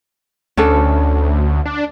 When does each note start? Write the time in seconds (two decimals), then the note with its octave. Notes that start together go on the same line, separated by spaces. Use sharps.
0.57 D2 C#4 D4 A4
1.65 D4